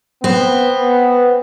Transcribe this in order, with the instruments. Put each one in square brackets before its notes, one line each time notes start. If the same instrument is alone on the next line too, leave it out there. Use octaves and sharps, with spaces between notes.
[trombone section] B3 [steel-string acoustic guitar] C4